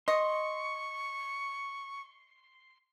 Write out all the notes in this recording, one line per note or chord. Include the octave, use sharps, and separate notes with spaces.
D#5 C6 C#6